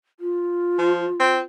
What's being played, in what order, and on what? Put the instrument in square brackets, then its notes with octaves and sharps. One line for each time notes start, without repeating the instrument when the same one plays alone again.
[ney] F4
[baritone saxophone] F3
C4